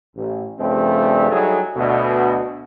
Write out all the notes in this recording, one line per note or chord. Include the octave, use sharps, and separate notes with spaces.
A1
G2 C#3 F3 G3 A3 C4
F#3 G3 D#4 E4 G#4 A4
D2 B2